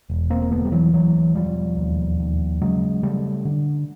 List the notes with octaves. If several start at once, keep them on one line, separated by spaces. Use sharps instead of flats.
E1
A#3 C4
A#3
D2 A3 B3
G3
E3 F#3
D2 E3 F#3
E1 F3 G3
D#2
D#2
C#3 F#3 G#3
C#3 G3 A3
D3